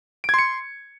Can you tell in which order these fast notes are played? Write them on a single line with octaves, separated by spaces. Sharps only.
D7 G#6 C6 C#7